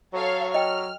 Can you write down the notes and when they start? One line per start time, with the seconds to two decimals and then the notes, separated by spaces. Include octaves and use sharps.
0.13 F#3 A4 C#5 F5
0.54 D#5 G5 F6